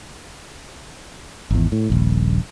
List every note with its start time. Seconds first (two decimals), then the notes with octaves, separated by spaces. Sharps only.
1.51 G#1 E2
1.72 A2
1.90 D#1 A#1